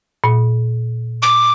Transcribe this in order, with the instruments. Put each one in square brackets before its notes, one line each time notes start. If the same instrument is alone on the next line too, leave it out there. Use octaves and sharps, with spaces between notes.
[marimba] A#2
[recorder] D6